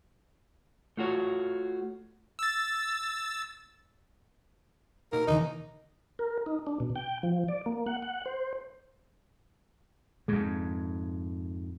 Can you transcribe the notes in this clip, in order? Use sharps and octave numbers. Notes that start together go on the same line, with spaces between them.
A3 F4 F#4 C#5
E6 A6
B2 A#3 D#4 A#4
D#2 C#3 E3 D#4
A#4
D#4
D4
B2
G5
F3
D5
A#3
F#5
F#5
C5
F2 G#2 G#3